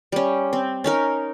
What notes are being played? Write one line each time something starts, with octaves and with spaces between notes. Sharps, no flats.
G3 C#4
C4
C#4 D#4 A#4